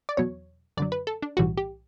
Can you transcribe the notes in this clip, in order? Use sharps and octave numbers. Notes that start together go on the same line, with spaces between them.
D5
E2 B2 F#3 C#5
F#2 D3 F#3 D5
B4
A4
D4
B1 A2 E3 G3 F#4
G4